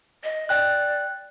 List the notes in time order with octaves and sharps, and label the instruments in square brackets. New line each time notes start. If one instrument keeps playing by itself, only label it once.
[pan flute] D#5
[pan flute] D5 [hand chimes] G5 F#6